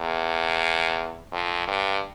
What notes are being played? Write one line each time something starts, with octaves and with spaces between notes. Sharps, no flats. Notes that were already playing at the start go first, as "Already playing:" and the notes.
Already playing: E2
F2
G2